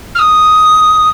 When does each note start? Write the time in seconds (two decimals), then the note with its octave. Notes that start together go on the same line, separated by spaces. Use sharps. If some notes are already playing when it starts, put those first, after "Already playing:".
0.15 F6
0.19 D#6